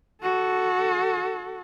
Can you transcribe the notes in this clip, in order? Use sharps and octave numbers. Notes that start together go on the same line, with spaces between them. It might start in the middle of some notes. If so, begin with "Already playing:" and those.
F#4 A4